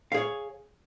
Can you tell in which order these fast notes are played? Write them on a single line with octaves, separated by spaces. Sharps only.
F5 G#4 C#5